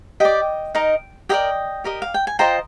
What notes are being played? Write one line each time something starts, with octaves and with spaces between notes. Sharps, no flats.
G4 D5 D#5 G5
D#4 A#4 D#5
G4 A#4 D5 D#5 G5
G4 A#4 D#5
F5
G5
G#5
F4 C5 D#5 G5 A#5